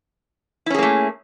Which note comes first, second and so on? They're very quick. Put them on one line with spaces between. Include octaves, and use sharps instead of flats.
E4 C#4 G#4 A#3 A3